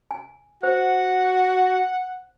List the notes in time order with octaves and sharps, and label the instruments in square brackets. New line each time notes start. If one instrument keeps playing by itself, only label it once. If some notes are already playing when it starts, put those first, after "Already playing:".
[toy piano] G#5
[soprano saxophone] F#4 [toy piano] C5 [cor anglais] F#5